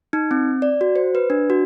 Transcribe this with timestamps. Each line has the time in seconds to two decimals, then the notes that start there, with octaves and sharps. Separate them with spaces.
0.13 D#4
0.31 C4
0.62 D5
0.81 F#4
0.96 C5
1.15 B4
1.30 D4
1.50 F#4